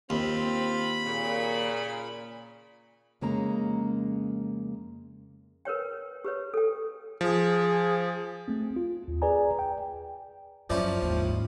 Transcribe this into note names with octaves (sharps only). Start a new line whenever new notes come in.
D#2 C4 F4 B5
A#2 C#3
F2 C#3 G#3 A#3 C#4 A#5
A#4 B4 C#5 G5
G4 B4 C#5
A4 G5
F3 G#4
A3 C4
F4
D#2
G#4 B4 D5 G#5 A#5
G5
F#2 F3 C#4 E4 D5
D#2 G#2